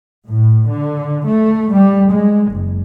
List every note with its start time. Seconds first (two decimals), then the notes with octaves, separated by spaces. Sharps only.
0.27 A2
0.69 D3
1.26 A3
1.72 G3
2.10 G#3
2.52 F#1